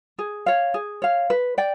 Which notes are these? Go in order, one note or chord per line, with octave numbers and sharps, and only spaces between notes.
G#4
C#5 F5
G#4
C#5 F5
B4
D5 G5